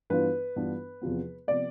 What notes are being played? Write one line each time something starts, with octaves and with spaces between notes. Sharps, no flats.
G2 E3 B3 D4 F4 B4
G2 E3 B3 D4 F4
E2 C3 F3 B3
C3 F3 B3 D5